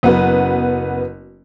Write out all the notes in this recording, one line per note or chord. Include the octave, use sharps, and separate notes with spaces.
F#1 B3 F#4 B4